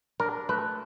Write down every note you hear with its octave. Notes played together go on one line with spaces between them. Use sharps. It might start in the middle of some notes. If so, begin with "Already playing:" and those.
D4 A#4
A3 B4